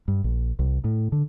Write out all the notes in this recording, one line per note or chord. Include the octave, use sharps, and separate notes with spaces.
G2
A#1
C2
A2
D3